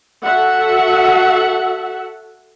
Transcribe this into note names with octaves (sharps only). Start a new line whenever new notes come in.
F#4 A4 E5 F#5